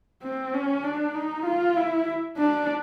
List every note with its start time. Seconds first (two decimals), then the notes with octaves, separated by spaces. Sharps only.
0.23 C4
0.54 C#4
0.84 D4
1.15 D#4
1.46 F4
1.77 E4
2.37 D4